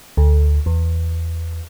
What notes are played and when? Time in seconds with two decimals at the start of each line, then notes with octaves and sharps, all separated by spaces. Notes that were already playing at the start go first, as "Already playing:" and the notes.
0.17 D2
0.66 E2